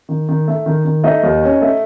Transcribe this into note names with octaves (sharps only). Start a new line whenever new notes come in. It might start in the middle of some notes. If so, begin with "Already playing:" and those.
D#3
D#3
A3
D#3
D#3
A3 D#4 D#5
D#2
C#4
A3